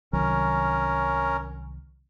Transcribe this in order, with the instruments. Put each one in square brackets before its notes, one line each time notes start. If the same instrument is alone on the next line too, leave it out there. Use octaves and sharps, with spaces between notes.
[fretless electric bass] C2 D#3 F#3 [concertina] C#4 A#4